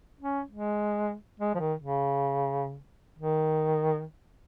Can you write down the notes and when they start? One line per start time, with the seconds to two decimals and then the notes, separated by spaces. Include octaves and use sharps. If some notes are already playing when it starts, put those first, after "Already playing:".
0.21 C#4
0.51 G#3
1.40 G#3
1.55 F3
1.60 D#3
1.79 C#3
3.19 D#3